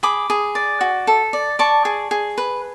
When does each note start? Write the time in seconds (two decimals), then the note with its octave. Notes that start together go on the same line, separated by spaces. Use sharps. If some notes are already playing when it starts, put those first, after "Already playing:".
0.03 G#4 B5 D6
0.30 G#4
0.55 D5
0.81 F#4
1.07 A4
1.33 D5
1.59 D5 A5 C#6
1.85 G#4
2.11 G#4
2.38 B4